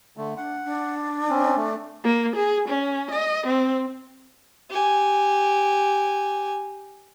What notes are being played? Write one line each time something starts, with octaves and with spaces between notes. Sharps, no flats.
D3 A3
D4 F#5
D4
C4 C#4
A3
A#3
G#4
C#4
D#5
C4
G4 G#5